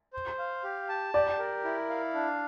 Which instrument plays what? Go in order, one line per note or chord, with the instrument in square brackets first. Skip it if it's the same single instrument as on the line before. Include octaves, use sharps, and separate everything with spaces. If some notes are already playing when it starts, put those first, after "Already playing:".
[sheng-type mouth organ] C5
F5
G4
A5
[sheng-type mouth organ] G4 [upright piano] D5
[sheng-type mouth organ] A#4
E4
F5
D4